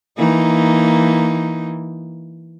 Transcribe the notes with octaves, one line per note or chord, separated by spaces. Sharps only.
E3 A#3 D#4